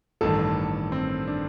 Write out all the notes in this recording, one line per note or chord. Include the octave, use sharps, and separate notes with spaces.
A1 G2 D#3 A4
C4
D4